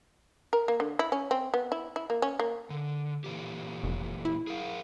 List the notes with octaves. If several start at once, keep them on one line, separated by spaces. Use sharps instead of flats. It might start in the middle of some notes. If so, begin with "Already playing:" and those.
A#4
A#3
D3
E4
C#4
C4
B3
E4
E4
A#3
C#4
A#3
D3
A#2 E3 G4
F1
E4
G#4 A#4 F5